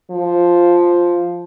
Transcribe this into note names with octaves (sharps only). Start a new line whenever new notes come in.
F3